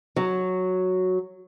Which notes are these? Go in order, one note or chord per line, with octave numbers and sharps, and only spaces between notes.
F#3